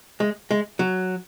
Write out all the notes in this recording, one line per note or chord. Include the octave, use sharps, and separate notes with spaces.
G#3
G#3
F#3